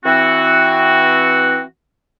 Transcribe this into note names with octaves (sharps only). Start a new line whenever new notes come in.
E3 C4 F#4